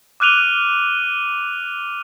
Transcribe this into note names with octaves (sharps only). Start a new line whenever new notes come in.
D6 F6 F#6 D#7 F7 G7